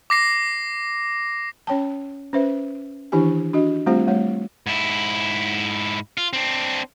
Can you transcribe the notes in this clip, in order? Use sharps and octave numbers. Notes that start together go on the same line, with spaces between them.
D6 A#6 C7
C#4 C#5 G5 A5
C#4 B4 C5 E5
D#3 E3 D4 E4 G4 G#5
D4 F#4 D#5
G3 A3 C4 F4 G4 C5
G3 A3 C#5
G#2 E4
F4
C4 D4